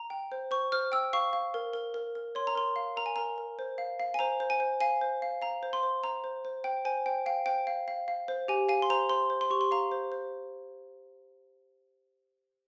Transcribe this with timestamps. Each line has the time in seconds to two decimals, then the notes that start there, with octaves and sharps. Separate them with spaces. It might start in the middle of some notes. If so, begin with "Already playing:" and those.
Already playing: A#5
0.10 G5
0.32 C5
0.51 C5 C#6
0.72 C5 F6
0.92 G5 E6
1.13 F5 C#6
1.33 F5
1.54 A#4
1.73 A#4
1.94 A#4
2.15 A#4
2.35 C#5 C6
2.47 A#5
2.55 A#4 C6
2.76 F5
2.96 A#4 A#5
3.06 G#5
3.16 A#4 A#5
3.38 A#4
3.59 C5
3.78 F5
4.00 F5
4.14 G#5
4.19 C5 A#5
4.40 C5
4.50 G#5
4.60 C5
4.81 F5 G#5
5.01 C5
5.22 F5
5.42 F5 A#5
5.63 C5
5.73 C6
5.83 C5
6.03 C5 A#5
6.24 C5
6.45 C5
6.64 C5 G5
6.85 C5 G#5
7.06 C5 G5
7.26 F5 G5
7.46 C5 G5
7.67 F5
7.88 F5
8.08 F5
8.28 C5
8.48 G4 G#5
8.69 F5 G#5
8.82 C6
8.90 C5 A#5
9.09 C5 C6
9.30 C5
9.41 C6
9.50 G4 C#6
9.61 C6
9.71 F5 A#5
9.91 C5
10.12 C5